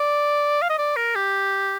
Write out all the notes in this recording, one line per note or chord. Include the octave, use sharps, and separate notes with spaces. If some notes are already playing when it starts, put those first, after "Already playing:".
Already playing: D5
F5
D#5
D5
A#4
G4